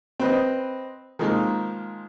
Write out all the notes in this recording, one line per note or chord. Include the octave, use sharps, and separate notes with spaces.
C4 B4 D#5
D#3 F3 G#3 A#3